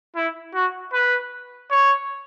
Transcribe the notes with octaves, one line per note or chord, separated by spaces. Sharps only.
E4
F#4
B4
C#5